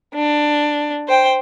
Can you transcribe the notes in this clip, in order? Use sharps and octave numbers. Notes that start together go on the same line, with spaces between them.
D4
C5 G5